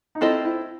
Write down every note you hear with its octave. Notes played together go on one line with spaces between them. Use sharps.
D#4
C4 E4 F4 A4 C5 D#5
E4